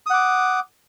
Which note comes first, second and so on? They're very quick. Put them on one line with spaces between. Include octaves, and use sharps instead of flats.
D#6 F#5 D6